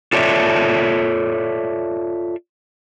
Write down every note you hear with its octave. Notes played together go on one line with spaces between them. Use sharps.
F4 A4 C#5 D5 E5